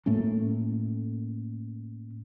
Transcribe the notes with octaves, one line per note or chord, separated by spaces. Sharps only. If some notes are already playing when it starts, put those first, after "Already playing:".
A2 A3 A#3 C#4